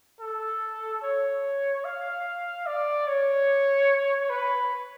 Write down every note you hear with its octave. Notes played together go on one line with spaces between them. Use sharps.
A4
C#5
F5
D5
C#5
B4